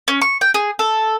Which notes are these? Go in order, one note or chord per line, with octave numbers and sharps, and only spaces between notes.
C#4
C#6
G5
G#4
A4